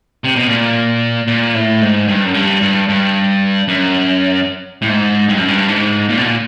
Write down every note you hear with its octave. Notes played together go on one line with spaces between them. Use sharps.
C3
B2
A#2
A#2
A2
G#2
G2
F#2
G2
G2
G2
F#2
A2
G#2
G2
F#2
G2
G#2
A#2
B2
A#2